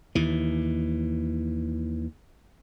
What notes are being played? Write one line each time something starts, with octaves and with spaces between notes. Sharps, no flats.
D#2 E3